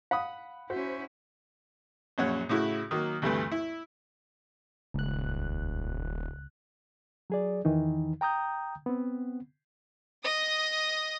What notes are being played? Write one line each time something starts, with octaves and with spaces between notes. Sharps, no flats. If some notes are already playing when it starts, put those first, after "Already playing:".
F5 F#5 B5 D#6
C#4 E4 F#4 C5
A#1 F#2 A#2 C#5 F#5
A2 C#3 E4 F#4
D#3 F#3 A#3
D2 G2 C3 E3 A3
E4
D#1 C#2 F#6
F#3 G#4 D5
E2 D#3 E3 D#4
G5 A#5 D#6 G6
B3 C4
D#5 D#6